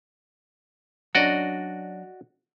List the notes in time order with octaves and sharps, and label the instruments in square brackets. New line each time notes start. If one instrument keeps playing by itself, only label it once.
[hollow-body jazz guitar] F#3 C#4 D4 [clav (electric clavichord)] F#4 D5 D#5